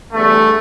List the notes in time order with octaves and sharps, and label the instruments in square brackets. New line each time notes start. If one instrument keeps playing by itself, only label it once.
[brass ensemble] E2 D3 G3 A3